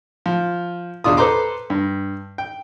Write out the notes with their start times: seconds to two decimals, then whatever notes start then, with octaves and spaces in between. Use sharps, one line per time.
0.26 F3
1.04 E2 B2 D4 F4 D#6
1.17 A4 B4 C5 A#5 C6 D6
1.70 G2
2.38 G5